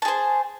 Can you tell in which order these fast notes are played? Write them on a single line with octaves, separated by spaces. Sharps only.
A5 G#4 C5